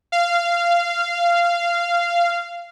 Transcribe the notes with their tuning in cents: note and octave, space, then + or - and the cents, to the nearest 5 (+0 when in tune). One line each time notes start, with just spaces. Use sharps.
F5 -15